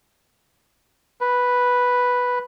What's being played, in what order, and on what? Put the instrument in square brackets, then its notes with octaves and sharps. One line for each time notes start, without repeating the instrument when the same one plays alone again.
[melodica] B4